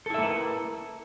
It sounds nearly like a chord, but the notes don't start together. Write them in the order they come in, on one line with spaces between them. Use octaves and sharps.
A4 E4 E5 A#3 B4